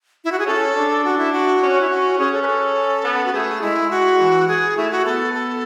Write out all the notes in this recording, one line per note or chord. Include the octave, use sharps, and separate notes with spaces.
E4
F#4
G#4
C#4 A4
D4
F#4
E4
F#4
C#4
E4
F#4
C#4 G#4
A4
B4
A4
B3
F#4
A3 G#4
G#3 E4
F#4
E3
G#4
A3 E4
F#4
B3 A4
A4